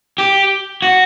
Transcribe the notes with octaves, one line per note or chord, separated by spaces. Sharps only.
G4
F#4